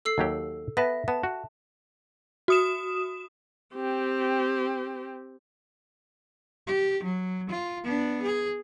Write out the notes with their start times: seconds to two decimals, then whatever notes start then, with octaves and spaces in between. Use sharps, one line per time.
0.05 A4 E6 C7
0.18 D#2 F#3 G4
0.77 B3 B4 E5 A5 A#6
1.08 B3 A5
1.23 F#4
2.48 F#4 D#6 E7
3.75 C4 G4
6.67 G4
7.03 F#3
7.50 F4
7.84 B3 D4
8.22 G#4